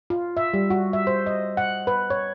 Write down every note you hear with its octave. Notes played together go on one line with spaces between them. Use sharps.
F4
E5
G3
F#4
E5
C5
D#5
F#5
B4
C#5